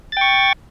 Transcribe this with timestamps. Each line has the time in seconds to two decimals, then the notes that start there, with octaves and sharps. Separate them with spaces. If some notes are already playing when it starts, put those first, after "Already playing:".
0.12 A6
0.17 G5
0.21 C#6